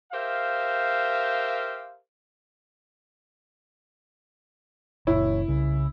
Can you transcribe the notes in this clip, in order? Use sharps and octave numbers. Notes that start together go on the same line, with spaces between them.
G4 A#4 C5 E5 F5
F#1 A#2 E4 C#5
C2 C#3